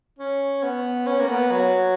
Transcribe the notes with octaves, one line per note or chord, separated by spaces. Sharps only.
C#4
B3
C#4
A#3
B3
F#3